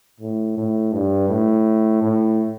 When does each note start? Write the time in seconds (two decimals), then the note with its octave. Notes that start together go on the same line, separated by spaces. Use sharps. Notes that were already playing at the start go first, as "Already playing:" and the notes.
0.20 A2
0.57 A2
0.93 G2
1.29 A2
2.02 A2